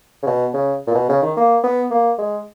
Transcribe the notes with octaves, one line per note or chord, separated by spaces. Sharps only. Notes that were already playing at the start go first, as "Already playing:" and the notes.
C#3
B2
C#3
A#2
B2
C#3
D#3
A#3
B3
A#3
G#3